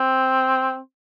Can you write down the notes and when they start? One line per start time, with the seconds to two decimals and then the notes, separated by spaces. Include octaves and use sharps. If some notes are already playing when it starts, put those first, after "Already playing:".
Already playing: C4